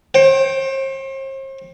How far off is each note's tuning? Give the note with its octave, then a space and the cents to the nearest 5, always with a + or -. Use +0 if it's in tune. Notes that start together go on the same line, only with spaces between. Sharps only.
C5 +45 G5 -5